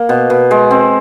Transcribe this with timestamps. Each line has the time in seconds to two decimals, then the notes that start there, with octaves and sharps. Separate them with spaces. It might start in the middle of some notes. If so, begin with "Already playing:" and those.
Already playing: A#3
0.09 B2
0.30 B2
0.51 G#3
0.71 C4